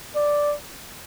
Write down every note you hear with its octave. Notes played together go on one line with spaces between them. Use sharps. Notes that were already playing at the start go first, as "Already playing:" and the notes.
D5